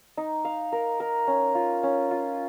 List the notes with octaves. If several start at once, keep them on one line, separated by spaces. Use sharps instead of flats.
D#4
F5
A#4
A#4
C#4
F4
C#4
F4